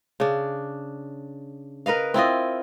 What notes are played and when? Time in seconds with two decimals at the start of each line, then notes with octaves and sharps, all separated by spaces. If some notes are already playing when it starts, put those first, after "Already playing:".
0.20 C#3 D4
1.86 A#4 B4 D#5 F5
2.14 C4 E4 F4 D#5